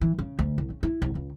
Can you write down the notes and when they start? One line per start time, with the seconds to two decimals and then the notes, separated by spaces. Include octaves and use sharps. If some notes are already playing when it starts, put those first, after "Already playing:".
0.01 E3
0.19 C#3
0.39 D2
0.58 C2
0.70 C#3
0.83 E4
1.02 C2
1.15 C#2